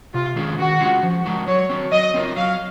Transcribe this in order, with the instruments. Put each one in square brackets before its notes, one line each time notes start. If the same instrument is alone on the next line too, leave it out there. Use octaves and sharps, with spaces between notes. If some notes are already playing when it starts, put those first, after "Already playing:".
[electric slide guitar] C3 [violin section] F4
[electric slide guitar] D#3 G#3 C#4 G#4
[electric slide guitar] D#3 [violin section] F#4
[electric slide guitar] G#3 C#4 F4
F3
G#3 D#4 F#4
[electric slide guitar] F#3 [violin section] C#5
[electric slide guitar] C4 F#4
[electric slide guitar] F#3 [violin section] D#5
[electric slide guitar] C4 F4 A#4
[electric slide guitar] F#3 [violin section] F5